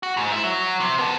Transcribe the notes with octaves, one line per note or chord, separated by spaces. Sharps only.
F#4
G#2
E4
F#3
C3
B3 A4